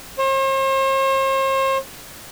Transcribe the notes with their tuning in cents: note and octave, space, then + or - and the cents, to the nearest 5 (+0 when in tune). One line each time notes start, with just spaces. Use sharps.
C5 +45